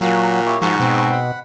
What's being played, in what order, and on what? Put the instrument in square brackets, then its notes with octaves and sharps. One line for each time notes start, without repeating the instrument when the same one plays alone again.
[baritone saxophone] A#2 [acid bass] F#3 [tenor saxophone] A#3 [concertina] F#4
[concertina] E4 G4 C#5
[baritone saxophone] G#2 [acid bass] F3 [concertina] F#4 C#6
[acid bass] B2 [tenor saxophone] C4
[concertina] F#5 B5